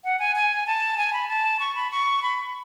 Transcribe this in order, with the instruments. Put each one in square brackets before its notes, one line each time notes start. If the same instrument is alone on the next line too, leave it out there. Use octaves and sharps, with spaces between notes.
[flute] F#5
G#5
G#5
A5
G#5
B5
A5
C#6
B5
C#6
B5